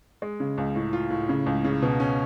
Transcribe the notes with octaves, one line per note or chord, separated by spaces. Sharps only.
G#3
C#3
C#2
A2
F4
A2
C#3
C#2
C#3
B2
C#4